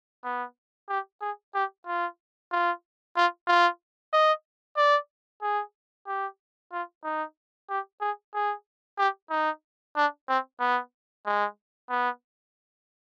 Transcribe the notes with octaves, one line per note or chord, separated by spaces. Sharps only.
B3
G4
G#4
G4
F4
F4
F4
F4
D#5
D5
G#4
G4
F4
D#4
G4
G#4
G#4
G4
D#4
D4
C4
B3
G#3
B3